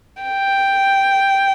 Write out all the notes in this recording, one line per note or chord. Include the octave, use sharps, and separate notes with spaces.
G5